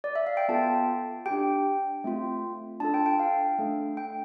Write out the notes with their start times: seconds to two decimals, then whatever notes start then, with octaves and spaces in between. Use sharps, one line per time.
0.04 D5
0.16 E5
0.27 F5
0.37 G5
0.49 B3 F4 A4 A5
1.26 G4 G5
1.31 D4
2.04 A3 C4 F4
2.80 D4 F4 A4 A5
2.94 G5
3.06 G5
3.19 F5
3.59 A3 D4 A4
3.97 G5